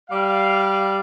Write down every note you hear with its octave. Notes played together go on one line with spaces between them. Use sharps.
G3 D5 F5